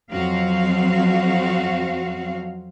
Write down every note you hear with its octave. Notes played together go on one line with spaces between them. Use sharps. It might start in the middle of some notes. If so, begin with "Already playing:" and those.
F2 F#3 C4 F#4 F5